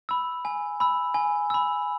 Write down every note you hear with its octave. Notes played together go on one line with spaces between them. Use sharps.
B5 E6
G#5
B5 E6
G#5
B5 E6